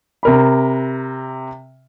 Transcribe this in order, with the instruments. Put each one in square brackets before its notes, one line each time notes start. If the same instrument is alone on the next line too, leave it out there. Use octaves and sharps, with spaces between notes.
[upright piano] C3 A#4 B5